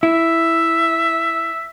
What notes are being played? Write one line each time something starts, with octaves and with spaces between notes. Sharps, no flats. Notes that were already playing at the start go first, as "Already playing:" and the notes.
E4 E5